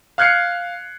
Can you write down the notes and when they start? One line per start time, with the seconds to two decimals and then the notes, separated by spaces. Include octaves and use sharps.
0.18 F5 F6 F#6 G#6 C7 C#7